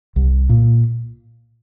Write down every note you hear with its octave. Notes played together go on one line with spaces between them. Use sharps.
C2
A#2